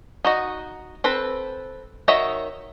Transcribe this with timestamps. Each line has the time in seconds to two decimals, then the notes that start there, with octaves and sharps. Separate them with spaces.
0.25 D#4 F#4 D#5
1.04 C4 A4 B4
2.08 D#3 F#4 C#5 D#5 E5